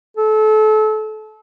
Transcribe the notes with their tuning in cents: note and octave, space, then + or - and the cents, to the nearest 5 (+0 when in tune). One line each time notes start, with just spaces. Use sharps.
A4 -30